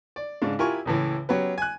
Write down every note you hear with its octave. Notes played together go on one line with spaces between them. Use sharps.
D5
G#2 C#3 D4
E4 F4 G4 A#4 G#5 C#6
C#2 A2 E3
F#3 B3 C#4 G4 B4
G#5 F#6